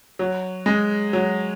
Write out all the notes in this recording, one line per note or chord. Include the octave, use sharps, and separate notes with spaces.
F#3
G#3
F#3